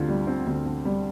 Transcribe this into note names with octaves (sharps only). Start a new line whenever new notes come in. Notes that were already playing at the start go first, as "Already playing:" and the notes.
Already playing: D2 D3 C4 F4 G4
G3
C4
D2
D3
G3